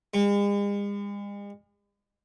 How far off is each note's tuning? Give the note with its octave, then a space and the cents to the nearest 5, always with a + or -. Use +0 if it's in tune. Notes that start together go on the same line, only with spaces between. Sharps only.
G#3 -45